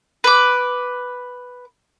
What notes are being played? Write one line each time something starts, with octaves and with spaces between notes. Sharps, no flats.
B4 D6